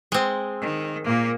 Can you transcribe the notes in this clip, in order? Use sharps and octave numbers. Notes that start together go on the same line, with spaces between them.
G#3 C4
D#3
A#2 A#3